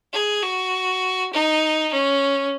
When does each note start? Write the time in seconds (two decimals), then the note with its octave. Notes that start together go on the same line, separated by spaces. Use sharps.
0.13 G#4
0.42 F#4
1.33 D#4
1.92 C#4